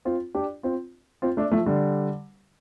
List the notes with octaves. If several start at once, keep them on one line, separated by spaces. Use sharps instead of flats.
C4 F4
D4 G4
C4 F4
C4 F4
A3 D4
F3 A3
D3 G3